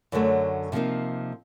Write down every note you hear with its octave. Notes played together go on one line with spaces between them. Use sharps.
F#2 D3 F#3 A3
C3 F3 A#3 D#4